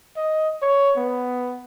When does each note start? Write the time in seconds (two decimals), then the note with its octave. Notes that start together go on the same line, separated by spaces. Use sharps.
0.17 D#5
0.62 C#5
0.97 B3